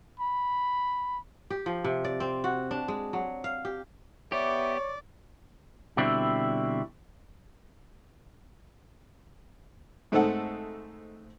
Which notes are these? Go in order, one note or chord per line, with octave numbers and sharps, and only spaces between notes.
B5
G4
F3
C3
D5
C4
F#4
D4
G#3
F#3
F5
G4
B3 G4 C#5 D5 E5
B2 D3 G3 C4 E4
G#2 A3 C4 D#4 A4 F#5